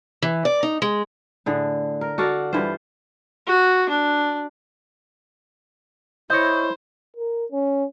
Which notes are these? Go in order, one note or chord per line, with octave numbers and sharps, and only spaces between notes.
E3
D5
D#4
G#3
A2 D3 G#4
A#4
F#4 A4 D5 F5
G2 E3 F4 C5
F#4
D4
E4 C5 C#5 D#5 G6
A#4
C#4